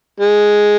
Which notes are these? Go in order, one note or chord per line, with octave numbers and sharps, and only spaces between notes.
G#3